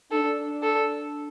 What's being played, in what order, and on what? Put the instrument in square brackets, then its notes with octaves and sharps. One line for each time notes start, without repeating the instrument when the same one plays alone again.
[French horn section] D4 [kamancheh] A4
[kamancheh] A4